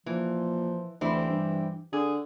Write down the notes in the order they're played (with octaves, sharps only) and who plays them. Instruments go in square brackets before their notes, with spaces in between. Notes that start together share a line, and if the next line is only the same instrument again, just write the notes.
[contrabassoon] A#2 [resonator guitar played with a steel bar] E3 [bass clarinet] F3
[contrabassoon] D2 [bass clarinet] E3 [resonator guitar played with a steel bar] C4 E4 G4
[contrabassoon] G2
[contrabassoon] D3 [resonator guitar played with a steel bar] G#4